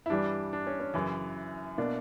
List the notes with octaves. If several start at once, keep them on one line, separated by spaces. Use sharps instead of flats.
E4
G2 E3 G3 D4
D4
C#4
C#4
F#2 C#3 E3 E4
B2 A#3 D4